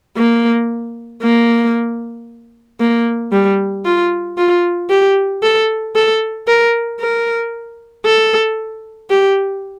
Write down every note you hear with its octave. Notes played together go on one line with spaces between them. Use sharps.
A#3
A#3
A#3
G3
F4
F4
G4
A4
A4
A#4
A#4
A4
G4